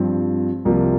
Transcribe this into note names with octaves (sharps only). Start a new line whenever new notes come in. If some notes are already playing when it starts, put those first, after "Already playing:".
Already playing: G2 F3 C4
C2 C3 F3 A#3